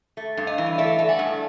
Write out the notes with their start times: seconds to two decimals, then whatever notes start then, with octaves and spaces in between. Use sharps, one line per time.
0.17 A3
0.37 G2
0.47 D#5 F5
0.58 E3
0.66 F5
0.78 A3 D5 E5
0.99 A3
1.09 F#5 G#5
1.19 G2